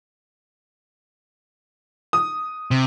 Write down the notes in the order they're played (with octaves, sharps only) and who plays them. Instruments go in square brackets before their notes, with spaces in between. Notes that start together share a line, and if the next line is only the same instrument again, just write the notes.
[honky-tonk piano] D#6
[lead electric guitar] C3